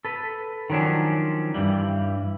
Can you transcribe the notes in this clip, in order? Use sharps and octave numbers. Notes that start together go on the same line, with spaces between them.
A4 B4
D#3 F3 F#3 C#4 D4
G2 E3 G3